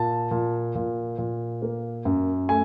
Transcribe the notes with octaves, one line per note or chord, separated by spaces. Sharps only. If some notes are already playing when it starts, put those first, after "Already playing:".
Already playing: A#2 A5
A#2
A#2
A#2
A#3
F#2
A3 G#5